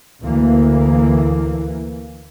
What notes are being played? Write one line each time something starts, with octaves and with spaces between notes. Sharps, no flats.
D2 E3 A#3